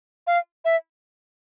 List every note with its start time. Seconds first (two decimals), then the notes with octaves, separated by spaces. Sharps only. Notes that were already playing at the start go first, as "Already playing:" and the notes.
0.27 F5
0.65 E5